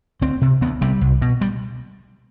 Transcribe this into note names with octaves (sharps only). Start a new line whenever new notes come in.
D2 C4
C3
D2 B3
C3 G3
C2
B2
G3